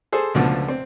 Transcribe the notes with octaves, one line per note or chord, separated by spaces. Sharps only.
G#4 A4 C5
C#2 B2 D3 F3 A3
C4